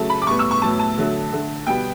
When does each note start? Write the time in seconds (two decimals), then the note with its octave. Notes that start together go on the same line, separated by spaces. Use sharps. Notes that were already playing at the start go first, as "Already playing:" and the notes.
Already playing: C#3 F#3 A3 A5
0.10 B5
0.22 D6
0.27 A2 G3 B3 C#6
0.39 E6
0.51 C#6
0.62 A2 F#3 B3 A5
0.79 A5
0.98 D3 F#3 A3
1.33 D3 A3
1.67 B2 G3 B3 G5